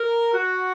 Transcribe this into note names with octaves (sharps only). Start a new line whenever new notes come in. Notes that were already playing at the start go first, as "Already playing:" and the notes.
Already playing: A#4
F#4